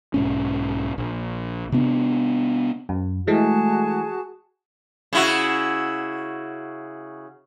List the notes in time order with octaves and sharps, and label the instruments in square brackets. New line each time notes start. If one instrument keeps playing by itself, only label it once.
[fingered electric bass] B1 G#2 C#4
A#1
C3 B3 D4
[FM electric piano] F#2
[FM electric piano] E3 G#3 A3 [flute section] F#4 G#4 A5
[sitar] C#3 E4 F#4